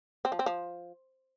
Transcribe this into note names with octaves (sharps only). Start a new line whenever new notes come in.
C4
F3
C4
F3